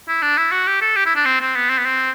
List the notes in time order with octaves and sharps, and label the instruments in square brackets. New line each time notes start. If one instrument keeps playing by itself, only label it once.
[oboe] E4
D4
E4
F#4
G4
A4
G4
E4
D4
C4
C4
B3
C4
B3
C4